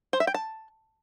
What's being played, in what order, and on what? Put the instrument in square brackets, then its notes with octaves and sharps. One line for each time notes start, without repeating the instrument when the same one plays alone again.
[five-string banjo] C5
E5
G5
A5